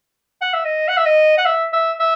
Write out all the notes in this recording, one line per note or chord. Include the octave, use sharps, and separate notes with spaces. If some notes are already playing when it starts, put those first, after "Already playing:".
F#5
E5
D#5
F#5
E5
D#5
F#5
E5
E5
E5